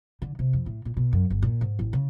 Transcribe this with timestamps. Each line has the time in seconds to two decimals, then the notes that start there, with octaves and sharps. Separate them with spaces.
0.22 D3
0.39 C3
0.53 F2
0.66 A2
0.85 A#2
0.97 B2
1.13 F#2
1.30 G1
1.42 A#2
1.61 G#2
1.79 A1
1.93 C#3